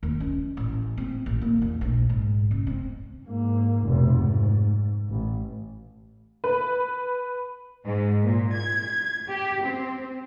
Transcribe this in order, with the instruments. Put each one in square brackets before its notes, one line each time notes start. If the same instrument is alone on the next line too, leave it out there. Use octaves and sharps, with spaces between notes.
[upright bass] D#2
C#4
A1
C4
A1
A#3
E2
A#1
G#2
C#3
C4
[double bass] G#2 A#3
F1 B2
G#2
A1
[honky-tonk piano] B4
[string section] G#2
A#2
G#6
G4
C4